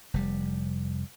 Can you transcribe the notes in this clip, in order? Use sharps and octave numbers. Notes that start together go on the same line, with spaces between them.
F1 G3